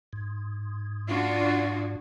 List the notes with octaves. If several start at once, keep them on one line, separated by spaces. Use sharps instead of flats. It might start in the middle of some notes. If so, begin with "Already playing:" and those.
G#2
D4 F4 F#4